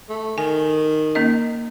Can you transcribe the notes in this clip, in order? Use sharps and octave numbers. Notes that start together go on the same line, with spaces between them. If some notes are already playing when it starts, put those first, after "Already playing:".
A3
D#3 G#5
A#3 C#4 D#5